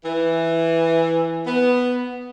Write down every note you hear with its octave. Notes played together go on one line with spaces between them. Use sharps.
E3
B3